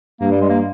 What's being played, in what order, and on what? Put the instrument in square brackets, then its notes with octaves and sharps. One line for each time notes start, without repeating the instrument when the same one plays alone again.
[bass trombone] G2 [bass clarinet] A#3
[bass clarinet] G3
G#3
A#3